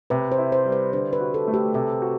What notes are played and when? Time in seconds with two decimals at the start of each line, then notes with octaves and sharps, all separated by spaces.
0.10 C3 B4
0.32 C5
0.38 E4
0.52 C5
0.65 G3
0.72 B4
0.93 D3 C5
1.13 B4
1.20 F#4
1.34 A4
1.48 A3
1.54 G4
1.74 C3 A4
2.02 F#4